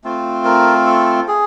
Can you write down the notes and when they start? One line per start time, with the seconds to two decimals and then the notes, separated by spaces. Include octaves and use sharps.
0.04 A3 C4 F4
0.45 A#4
0.87 A4
1.28 G#4